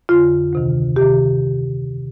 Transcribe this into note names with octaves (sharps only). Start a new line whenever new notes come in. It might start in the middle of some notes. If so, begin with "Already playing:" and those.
F2 D3 F4
D2 C3 D#3
D2 C3 D#3 G4